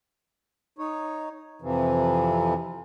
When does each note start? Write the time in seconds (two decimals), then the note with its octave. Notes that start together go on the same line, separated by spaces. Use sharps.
0.79 D#4 C#5
1.62 F2 C3 E3 F3